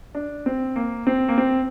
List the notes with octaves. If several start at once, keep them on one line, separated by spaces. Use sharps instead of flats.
D4
C4
A#3
C4
A#3
C4